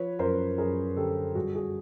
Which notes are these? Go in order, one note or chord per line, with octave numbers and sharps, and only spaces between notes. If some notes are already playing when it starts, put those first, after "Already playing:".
Already playing: F3 B4 C#5
F#2 A#4 C5
F#2 G#4 A#4
D3 G4 A4
G2 F#4 G#4
F#4 G#4